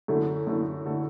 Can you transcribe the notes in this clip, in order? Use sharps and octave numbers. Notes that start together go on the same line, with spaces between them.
F#2 D3 A3 E4 A4
F#2 D3 A3 E4 A4
D3 A3 E4 A4